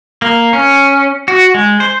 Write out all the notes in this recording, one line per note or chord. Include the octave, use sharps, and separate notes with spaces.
A#3
C#4
F#4
G#3
C5